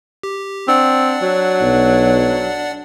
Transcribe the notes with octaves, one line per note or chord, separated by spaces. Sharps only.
G4
C4 D4 D5 F#5
F#3
B1